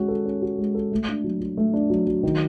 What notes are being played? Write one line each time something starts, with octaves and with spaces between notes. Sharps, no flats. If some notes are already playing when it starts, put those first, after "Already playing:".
Already playing: G#3 C#4 F#4
A4
C#4
F#4
G#3
A4
A3
D4
F#3
F#3
A3
D4
F#3
F#3
D#3